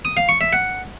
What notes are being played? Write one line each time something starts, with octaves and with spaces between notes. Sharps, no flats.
D#6
F5
C#6
E5
F#5